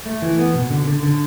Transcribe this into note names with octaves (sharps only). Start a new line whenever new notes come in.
A3
E3
B3
B2
D3
D3
D3